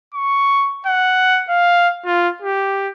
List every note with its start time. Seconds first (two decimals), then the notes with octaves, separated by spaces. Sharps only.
0.14 C#6
0.86 F#5
1.49 F5
2.06 F4
2.42 G4